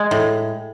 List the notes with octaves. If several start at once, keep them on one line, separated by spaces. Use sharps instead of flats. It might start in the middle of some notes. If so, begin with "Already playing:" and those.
Already playing: G#3
A2